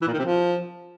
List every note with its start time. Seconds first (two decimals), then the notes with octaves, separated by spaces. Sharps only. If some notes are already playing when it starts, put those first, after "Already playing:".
0.02 E3
0.07 A#2
0.13 D#3
0.19 C3
0.24 F3